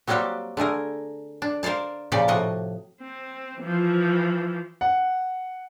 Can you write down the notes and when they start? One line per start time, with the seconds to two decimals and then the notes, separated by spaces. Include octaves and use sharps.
0.07 F#3 G3 A#3 C4 F#4 G4
0.57 D3 A3 G#4 A#4
1.42 D4
1.63 A#4 C5 D5 F5 A5
2.12 A#2 C#3 F3 G4 D5
2.28 A2 C3 F3 F#4 D#5
3.01 C4
3.60 E3 F3
4.81 F#5